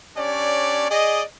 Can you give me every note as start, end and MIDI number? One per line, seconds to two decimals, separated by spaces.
0.16 0.88 61
0.16 0.88 62
0.16 0.88 67
0.16 0.88 73
0.16 0.88 74
0.90 1.22 68
0.90 1.22 74
0.90 1.22 75